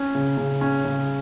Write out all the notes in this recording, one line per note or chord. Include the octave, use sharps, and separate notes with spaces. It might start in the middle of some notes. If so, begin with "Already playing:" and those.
Already playing: C#4
C#3
C#3
C#4
C#3